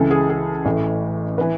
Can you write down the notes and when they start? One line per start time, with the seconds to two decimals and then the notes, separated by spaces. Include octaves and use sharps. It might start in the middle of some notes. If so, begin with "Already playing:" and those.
Already playing: C#2 C#3 E3 A4
0.11 G#4
0.30 G#4
0.65 A1 A2 E3
1.38 E3 B4